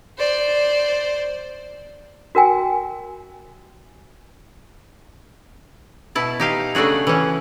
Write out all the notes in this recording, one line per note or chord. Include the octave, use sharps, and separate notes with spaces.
C5 D5
F#4 A#4 G5 G#5
B2 E4 A5
D#4 G4 F5
C#3 A3 D4 F#4 G#4
E3 C#4